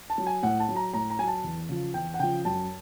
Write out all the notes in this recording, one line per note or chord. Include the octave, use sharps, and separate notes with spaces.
A5
F#3
G#5
A2 F#5
A5
F#3
A#5
A2 A#5
A#5
F#3 G#5
A5
E2
C#3 F3
E2 G5
F#5
C#3 F3 G5
F#2 A5